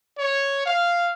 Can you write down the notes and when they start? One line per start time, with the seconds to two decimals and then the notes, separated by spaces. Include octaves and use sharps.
0.18 C#5
0.66 F5